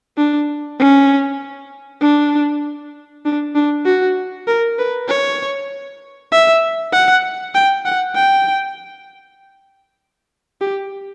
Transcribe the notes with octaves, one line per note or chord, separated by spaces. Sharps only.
D4
C#4
D4
D4
D4
F#4
A#4
B4
C#5
E5
F#5
G5
F#5
G5
G4